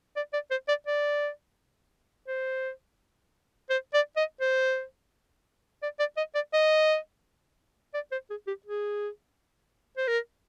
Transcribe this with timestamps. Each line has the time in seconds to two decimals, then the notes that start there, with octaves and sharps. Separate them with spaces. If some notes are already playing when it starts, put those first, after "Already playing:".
0.16 D5
0.33 D5
0.51 C5
0.68 D5
0.87 D5
2.28 C5
3.70 C5
3.93 D5
4.16 D#5
4.41 C5
5.83 D5
5.99 D5
6.17 D#5
6.35 D5
6.53 D#5
7.94 D5
8.12 C5
8.30 G#4
8.47 G4
8.66 G#4
9.97 C5
10.08 A#4